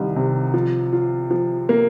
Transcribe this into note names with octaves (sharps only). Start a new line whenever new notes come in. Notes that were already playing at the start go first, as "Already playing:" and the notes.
Already playing: C2 D#3
C3
F3
F4
F3
A#3